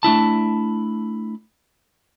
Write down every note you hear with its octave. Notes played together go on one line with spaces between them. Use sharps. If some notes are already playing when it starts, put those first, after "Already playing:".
A3 D4 E4 A5